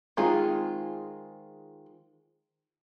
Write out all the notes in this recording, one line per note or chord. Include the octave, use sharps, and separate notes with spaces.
D#3 G#3 C4 F4 G#4